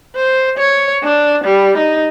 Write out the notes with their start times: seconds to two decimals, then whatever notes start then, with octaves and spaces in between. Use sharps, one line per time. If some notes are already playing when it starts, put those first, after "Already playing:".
0.16 C5
0.58 C#5
1.03 D4
1.44 G3
1.78 D#4